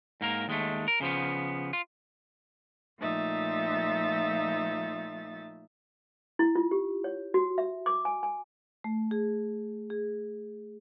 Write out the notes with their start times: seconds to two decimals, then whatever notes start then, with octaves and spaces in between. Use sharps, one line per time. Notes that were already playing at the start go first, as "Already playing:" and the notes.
0.21 G#2 A#3 A#4
0.48 D#2 G#3 A3
0.88 A#4
1.01 C#3 F3 B3
1.73 F4
2.99 A#2 F3 A3 D#4 E5 A6
6.39 E4
6.56 F4
6.71 G4
7.04 C#5
7.34 F#4
7.58 E5
7.86 D6
8.05 G#5
8.23 G#5
8.84 A3
9.11 G#4
9.90 G#4